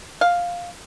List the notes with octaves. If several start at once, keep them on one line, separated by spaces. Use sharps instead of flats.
F5